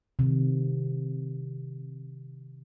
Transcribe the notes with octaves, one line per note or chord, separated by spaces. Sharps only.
C3 D#3